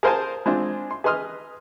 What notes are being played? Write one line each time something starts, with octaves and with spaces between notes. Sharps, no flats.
G#4 A#4 C5 F5 G#5 A5
G#3 C4 D4 F4
C6
G#4 B4 D#5 C6 D#6 F6